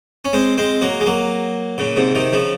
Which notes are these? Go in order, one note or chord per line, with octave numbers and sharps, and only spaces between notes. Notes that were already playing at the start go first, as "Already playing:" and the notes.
C#4
G#3 C4
G#3 C4
F#3 A#3
G#3
F#3 A#3
A#2 C#3
G#2 C3
C3 D#3
C#3 F3